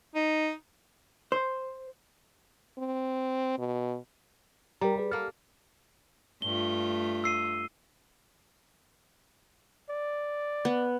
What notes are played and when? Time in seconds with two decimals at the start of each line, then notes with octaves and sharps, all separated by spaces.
0.15 D#4
1.32 C5
2.78 C4
3.58 B2
4.81 G3 A#4 G5 A#5
4.98 G#4 B4 D5
5.12 A#3 A4 F6
6.42 G2 A3 F4 G7
7.24 E6 C7 D#7
9.90 D5
10.65 B3